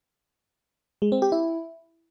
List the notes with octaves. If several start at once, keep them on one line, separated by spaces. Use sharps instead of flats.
G#3
C4
G4
E4